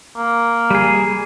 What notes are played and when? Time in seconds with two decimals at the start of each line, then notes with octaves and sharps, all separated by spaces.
0.17 A#3
0.70 G3 G#4